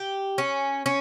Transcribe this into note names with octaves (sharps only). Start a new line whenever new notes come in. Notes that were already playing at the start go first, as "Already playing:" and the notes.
Already playing: G4
C#4
C#4